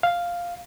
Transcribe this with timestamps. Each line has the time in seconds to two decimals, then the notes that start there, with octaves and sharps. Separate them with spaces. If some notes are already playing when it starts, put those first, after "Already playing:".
0.03 F5